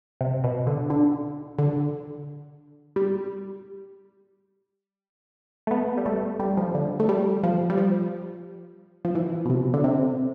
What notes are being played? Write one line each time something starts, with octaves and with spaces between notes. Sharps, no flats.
C3
B2
D3
D3
D3
G3
A3
B3
G3
A3
G3
F3
D3
A3
G3
F3
G3
F3
F3
E3
B2
C3
D3
C3